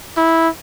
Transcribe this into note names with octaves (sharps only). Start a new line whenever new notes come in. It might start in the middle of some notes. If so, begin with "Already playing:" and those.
E4